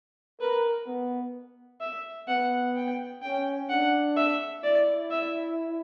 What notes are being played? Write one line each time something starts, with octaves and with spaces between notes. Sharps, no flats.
A#4 B4
B3
E5
B3 F#5
G5
C#4 G5
D4 F#5
E5
E4 D5
E5